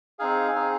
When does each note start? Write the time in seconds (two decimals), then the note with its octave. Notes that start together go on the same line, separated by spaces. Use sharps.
0.19 C4 D#4 G#4 F5 G#5
0.55 C4 D#4 G#4